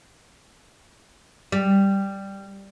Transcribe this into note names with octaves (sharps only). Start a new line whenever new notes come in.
G3